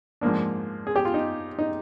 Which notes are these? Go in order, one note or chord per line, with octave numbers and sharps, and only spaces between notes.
G#2 F3 A#3 D4
G#4
G4
F4
D#4
D#4